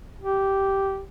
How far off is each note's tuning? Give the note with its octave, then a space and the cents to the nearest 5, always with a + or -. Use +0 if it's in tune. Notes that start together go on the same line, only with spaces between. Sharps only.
G4 -10